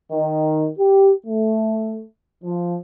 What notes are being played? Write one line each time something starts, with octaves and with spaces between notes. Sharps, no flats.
D#3
G4
A3
F3